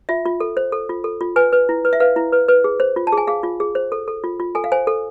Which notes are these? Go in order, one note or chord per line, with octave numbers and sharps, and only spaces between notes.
F4 E5
F4
A4
C5
A4
F4
A4
F4
B4 G#5
B4
E4
B4
E5
B4 F5
E4
B4
B4
G#4
C5
F4
A5
G#4
G#5
G#4 F5
F4
G#4
C5
A4
A4
F4
F4
A4 G#5
F5
C5 G#5
A4